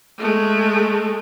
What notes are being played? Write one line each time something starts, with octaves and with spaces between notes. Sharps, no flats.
G#3 A3